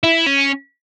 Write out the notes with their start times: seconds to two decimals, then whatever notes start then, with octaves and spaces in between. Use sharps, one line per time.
0.03 E4
0.26 C#4